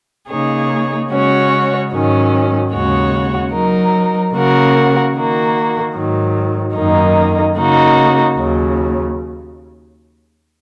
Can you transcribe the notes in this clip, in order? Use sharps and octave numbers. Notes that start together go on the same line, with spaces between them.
C#3 A#3 D#4 G#4 C#5
C#3 G#3 C#4 F#4 C#5
G#2 D#3 F#3 C#4
D#2 C#3 G#3 F#4 C#5
F#3 D#4 A#4
C#3 A#3 F#4 A#4
D#3 A#3 F#4
G#2 D#3 F#3
F#2 D#3 A#3 D#4
C#3 A#3 D#4 F#4
D#2 C#3 F#3